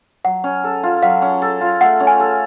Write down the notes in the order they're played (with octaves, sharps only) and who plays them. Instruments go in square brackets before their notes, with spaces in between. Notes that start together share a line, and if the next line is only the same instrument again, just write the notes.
[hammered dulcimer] F#3 [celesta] F#5
[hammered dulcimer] C#4
A4
F4
[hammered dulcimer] F#3 [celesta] F5
[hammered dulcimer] C#4
A4
F4
[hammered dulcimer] A3 [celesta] F#5
[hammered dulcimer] C#4
[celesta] G#5
[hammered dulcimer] A4